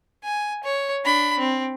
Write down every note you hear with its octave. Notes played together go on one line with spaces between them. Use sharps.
G#5
C#5
D4 B5
C4